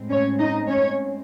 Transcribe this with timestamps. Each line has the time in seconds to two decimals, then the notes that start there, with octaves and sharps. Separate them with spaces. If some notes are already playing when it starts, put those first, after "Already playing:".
Already playing: A2 G#3 C4
0.09 C#4 C#5
0.39 D#4 D#5
0.68 C#4 C#5